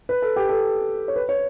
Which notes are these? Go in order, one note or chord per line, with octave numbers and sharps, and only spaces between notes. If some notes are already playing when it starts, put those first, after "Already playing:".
B4
A4
G4
A4
C#5
B4
C#5